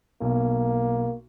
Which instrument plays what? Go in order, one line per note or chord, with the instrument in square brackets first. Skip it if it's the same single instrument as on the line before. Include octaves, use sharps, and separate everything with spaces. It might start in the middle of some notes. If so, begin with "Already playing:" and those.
[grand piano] B1 [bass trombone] A#3